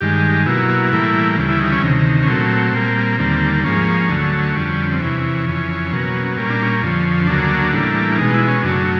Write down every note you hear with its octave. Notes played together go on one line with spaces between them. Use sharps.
G2 D#3 G#3 G4
B2 F#3 A#3 E4
A2 E3 G3 A#3
D2 C#3 E3 G3
E4
D#4
C#4
D2 C3 D#3
C#4
A#2 F#3 A3 C4
A#2 G3 A#3
D#2 D3 G3 A#3
G#2 F3 A#3 C#4
D2 D3 F#3 A3
F2 D3 G3
C4
E2 C3 E3 C#4
F2 C#3 E3
B2 F#3 A#3
A#2 G3 A#3 C#4
D4
C#4
F2 D3 F3
D2 C#3 F#3 A#3 D4
A2 E3 G3 A#3
B2 G#3 D#4
E4
C#4
F#2 C#3 F#3 A3 D4